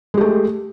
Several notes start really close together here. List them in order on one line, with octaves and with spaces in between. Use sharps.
G#3 G4 A3